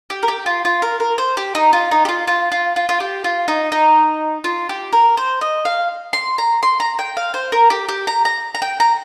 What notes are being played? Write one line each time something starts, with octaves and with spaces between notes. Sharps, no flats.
G4
A#4
G4
F4
F4
A#4
A#4
C5
G4
D#4
F4
D#4
G4
F4
F4
F4
F4
F4
G4
F4
D#4
D#4
F4
G4
A#4
C5
D#5
F5
C6
A#5
C6
A#5
G5
F5
C5
A#4
G4
G4
A#5
A#5
A#5
G5
A#5